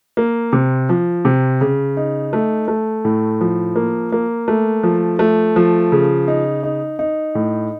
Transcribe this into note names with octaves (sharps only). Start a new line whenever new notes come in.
A#3
C3
F3
C3
C#3
D#4
A3
A3
A2
F3
A#3
A#3
A3
F3
A3
F3
C#3
D#4
D#4
D#4
A2